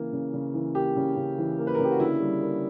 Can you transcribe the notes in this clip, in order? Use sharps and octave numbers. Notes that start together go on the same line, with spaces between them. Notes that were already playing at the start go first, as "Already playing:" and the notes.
Already playing: C#3 E3 A#3
C#3
C#3
E3
A#3 G4
C#3
C#3
E3
A#3
B4
A#4
C#3
G4
F#4
D3 E4
G3
A#3